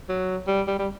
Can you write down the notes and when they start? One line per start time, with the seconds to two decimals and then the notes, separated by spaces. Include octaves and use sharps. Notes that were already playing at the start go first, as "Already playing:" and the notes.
0.09 F#3
0.47 G3
0.67 G3
0.79 G3